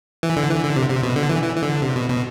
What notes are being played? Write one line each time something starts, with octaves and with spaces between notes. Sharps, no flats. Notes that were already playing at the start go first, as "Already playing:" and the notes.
E3
D3
E3
D3
C3
C3
B2
D3
E3
E3
E3
D3
C3
B2
B2